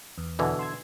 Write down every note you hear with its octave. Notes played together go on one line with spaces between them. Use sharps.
E2
B2 D3 E3
C6 E6 G#6